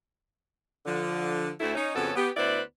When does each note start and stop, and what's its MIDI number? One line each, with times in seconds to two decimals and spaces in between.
0.86 1.50 50
0.86 1.50 53
1.60 1.72 38
1.60 1.72 57
1.60 1.72 64
1.75 1.91 61
1.75 1.91 63
1.95 2.11 41
1.95 2.11 49
1.95 2.11 59
1.95 2.11 61
1.95 2.11 66
1.95 2.11 69
2.16 2.30 59
2.16 2.30 67
2.37 2.61 38
2.37 2.61 59
2.37 2.61 64
2.37 2.61 71
2.37 2.61 72
2.37 2.61 74